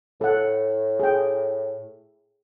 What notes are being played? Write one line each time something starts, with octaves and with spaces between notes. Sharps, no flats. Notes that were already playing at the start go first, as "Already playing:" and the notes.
A2 A4 F#5
G#4 G5